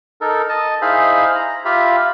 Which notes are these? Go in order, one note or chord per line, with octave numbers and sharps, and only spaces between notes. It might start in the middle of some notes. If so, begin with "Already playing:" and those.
D#4 A4 A#4
D#5 A5
D#4 E4 G#4 C5 F5 B5
A#5
F4 G4 E5 F5 B5